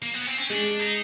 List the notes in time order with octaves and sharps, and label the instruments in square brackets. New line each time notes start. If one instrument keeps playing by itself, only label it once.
[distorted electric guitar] A#3
B3
C4
C#4
[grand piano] G#3 [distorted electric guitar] D4
[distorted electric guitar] D#4